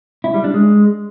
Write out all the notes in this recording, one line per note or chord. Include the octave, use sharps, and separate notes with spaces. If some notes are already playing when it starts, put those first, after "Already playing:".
E4
G3
D4
G#3